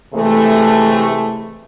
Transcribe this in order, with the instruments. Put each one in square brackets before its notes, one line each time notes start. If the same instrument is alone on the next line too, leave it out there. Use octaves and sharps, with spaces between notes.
[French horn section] C3 E3 G#3 A3